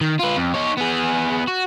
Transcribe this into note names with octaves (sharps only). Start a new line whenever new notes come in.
D#3
F4 B4
F2
D#4 C#5
B3 G#4
F#4